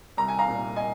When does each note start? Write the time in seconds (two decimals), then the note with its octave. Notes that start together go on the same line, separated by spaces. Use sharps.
0.17 C2 A#5
0.28 G#5
0.39 F5 A#5
0.47 A#2 A#3
0.76 D#5 G#5